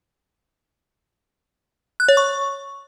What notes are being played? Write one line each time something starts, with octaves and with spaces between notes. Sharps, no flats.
F#6
C#5
C#6